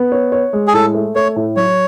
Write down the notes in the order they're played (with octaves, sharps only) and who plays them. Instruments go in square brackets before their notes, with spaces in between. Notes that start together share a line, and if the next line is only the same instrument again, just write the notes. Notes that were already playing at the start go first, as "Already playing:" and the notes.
Already playing: [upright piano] B3
C#5
C#5
G#3
[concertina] G#4
[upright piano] A2 [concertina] A4
[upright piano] A3
[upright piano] A3 [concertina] C#5
[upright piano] A2
[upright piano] F#3 [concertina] C#5